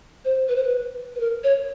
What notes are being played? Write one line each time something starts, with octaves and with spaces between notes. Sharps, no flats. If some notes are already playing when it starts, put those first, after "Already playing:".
C5
B4
C5
B4
B4
A#4
C#5